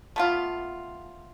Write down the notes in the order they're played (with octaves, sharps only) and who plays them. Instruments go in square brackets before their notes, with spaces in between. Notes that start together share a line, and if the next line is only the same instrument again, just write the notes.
[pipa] A3 B3 F4